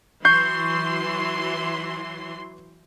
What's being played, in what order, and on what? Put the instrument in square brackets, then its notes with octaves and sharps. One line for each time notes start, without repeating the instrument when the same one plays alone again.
[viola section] E3 F#3 C6 [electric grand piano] C#6 G6 C7